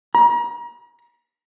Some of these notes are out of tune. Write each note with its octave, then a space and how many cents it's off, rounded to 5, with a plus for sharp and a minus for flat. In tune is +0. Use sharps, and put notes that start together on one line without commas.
A#5 +35